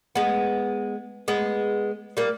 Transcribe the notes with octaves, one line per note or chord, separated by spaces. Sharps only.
G#3 B3
G#3 B3
G3 A#3